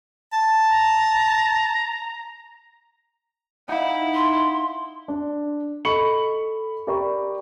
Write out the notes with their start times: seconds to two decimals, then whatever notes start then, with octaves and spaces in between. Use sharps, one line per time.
0.33 A5
0.70 A#5
3.69 D#4 E4 F5 F#5
4.15 C6
5.08 D4
5.85 A4 D#5 B5 C#6 C#7 F#7
6.87 G4 A#4 D5 A#5 B5 C#6